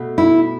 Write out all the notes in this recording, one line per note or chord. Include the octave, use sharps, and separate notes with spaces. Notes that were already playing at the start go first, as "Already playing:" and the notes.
Already playing: B2 A3
E4